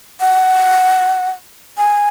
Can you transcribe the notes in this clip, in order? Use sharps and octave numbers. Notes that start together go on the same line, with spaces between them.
F#5
G#5